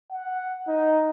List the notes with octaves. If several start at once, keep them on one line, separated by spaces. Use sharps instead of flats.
F#5
D#4